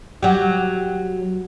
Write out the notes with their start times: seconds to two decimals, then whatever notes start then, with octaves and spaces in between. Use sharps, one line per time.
0.23 F#3 G4